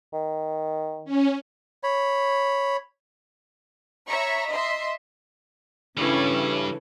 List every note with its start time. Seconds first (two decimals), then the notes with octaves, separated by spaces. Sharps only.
0.13 D#3
1.05 C#4
1.83 C#5 B5
4.08 C#5 E5 A#5 B5 C#6
4.48 D#5 E5 C6
5.97 G2 C#3 E3 G3 C#4 E4 A4